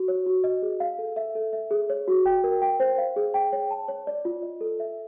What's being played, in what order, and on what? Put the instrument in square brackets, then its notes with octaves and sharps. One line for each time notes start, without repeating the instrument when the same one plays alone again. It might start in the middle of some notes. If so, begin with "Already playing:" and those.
Already playing: [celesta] F#4
C#5
F#4
D#5
G#4
F5
A4
E5
A4
E5
G#4
C#5
F#4
G5
A#4
G5
C5
F5
G#4
G5
C#5
A5
C#5
D5
F4
D#5
A4
E5